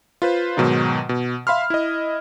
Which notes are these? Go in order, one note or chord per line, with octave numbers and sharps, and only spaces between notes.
F4 B4 C5
G#2 B2 D#3 F#3 D#4
B2
E5 F5 B5 C6 F6
E4 D#5